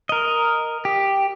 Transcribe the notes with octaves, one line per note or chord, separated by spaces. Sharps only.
A#4 D#5
G4